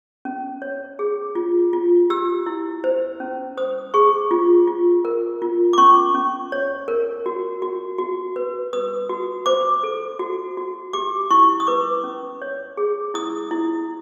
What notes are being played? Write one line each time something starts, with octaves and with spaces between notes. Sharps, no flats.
C#4
C#5
G#4
F4
F4
G4 E6
E4
C5
C#4
C5 D#6
G#4 C#6
F4
F4
A#4
F4
D6
C#4 C#6
C#4
C#5
A#4
F#4
F#4
F#4
B4
B4 D#6
F#4
C5 D6
A4
F#4
F#4
G4 D6
E4 C#6
D#6
B4 D6
C#4
C#5
G#4
E4 D#6
E4